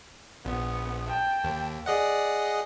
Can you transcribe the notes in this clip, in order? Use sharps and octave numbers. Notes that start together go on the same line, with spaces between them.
A#1 B3
G5 A5
D#2
G#4 D5 D#5 F#5